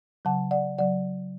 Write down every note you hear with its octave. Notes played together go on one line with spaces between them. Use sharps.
C#3 F#3 F#5 A5
D5 F#5
C#3 F#3 D5 F#5